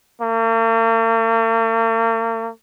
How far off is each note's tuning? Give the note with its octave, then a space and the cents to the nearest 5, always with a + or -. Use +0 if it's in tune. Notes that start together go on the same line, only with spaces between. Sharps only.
A#3 -45